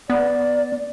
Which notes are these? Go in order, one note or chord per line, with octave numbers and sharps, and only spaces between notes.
B3 D5